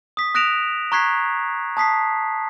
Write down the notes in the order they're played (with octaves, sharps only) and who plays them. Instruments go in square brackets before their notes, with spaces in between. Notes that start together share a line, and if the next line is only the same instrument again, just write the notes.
[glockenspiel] D#6 B6
D#6 F#6 A#6 D7 E7 F7
A#5 C#6 F#6 G#6 B6 C7
A5 D#6 B6 C7